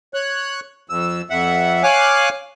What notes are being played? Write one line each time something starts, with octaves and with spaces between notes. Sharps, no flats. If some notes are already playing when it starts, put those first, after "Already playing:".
C#5 F#6
F2 E6
F2 E5 F#5
C#5 F5 G#5 D6 F6 F#6